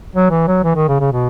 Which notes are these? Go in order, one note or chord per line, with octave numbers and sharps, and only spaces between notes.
F#3
E3
F#3
E3
D#3
C#3
C#3
B2